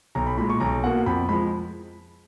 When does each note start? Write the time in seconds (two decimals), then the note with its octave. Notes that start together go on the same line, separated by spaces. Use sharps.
0.15 B1 A#5
0.27 B5
0.37 A#2 G#3 B5
0.50 C#6
0.60 B1 A#5
0.84 B2 A#3 F#5
1.06 F2 B5
1.29 F3 G#3 B5